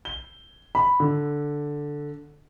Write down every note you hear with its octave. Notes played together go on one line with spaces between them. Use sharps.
G7
B5
D3